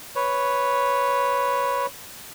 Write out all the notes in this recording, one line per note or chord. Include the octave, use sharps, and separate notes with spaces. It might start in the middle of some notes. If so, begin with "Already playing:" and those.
B4 C#5